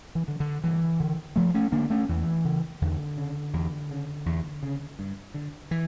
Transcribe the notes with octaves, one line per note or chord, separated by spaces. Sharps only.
E3
D3
D3
G2 E3
D3
G2 F3 A3
A3 C#4
D3 A#3 D4
A3 C#4
E2 E3
C#3
E2 D3
C#3
E2
C#3
E2
C#3
G2
D3
E3